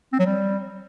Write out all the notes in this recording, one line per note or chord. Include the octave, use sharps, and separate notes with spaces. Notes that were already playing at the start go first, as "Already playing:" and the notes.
C4
F#3
G3